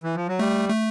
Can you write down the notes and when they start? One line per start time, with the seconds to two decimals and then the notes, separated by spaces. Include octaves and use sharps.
0.04 E3
0.15 F3
0.28 F#3
0.39 G3 A3
0.69 A3